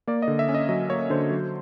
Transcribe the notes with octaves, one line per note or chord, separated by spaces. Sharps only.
A#3 D5
D#5
D3
E5
C#4
D#5
F#3 D#5
A#3 C#5
D3 C5
F#3